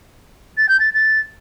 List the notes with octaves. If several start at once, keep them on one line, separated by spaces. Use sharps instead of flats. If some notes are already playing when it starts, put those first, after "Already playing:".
A6
G6
A6
A6